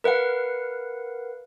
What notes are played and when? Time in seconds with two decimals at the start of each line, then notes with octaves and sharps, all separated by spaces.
0.04 A#4 B4 F5 F#5